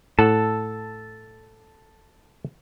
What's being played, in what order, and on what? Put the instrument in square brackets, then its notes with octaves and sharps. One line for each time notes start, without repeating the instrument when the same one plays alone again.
[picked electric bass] A2 [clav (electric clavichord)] A4 F#5 [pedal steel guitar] A5 E6